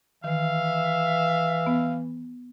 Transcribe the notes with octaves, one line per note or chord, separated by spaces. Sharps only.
D#3 E3 E5 F5
B3